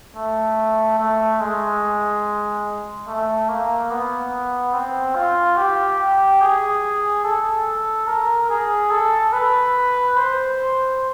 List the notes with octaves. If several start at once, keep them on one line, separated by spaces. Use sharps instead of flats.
A3
A3
G#3
A3
A#3
B3
C4
F4
G4
G#4
A4
A#4
G#4
A4
B4
C5